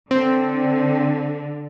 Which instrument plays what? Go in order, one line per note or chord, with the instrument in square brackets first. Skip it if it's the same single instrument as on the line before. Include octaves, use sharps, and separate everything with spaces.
[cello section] D3 [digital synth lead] C4